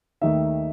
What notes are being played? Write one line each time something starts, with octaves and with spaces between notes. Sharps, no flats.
D#2 D#3 A3 D#4 E5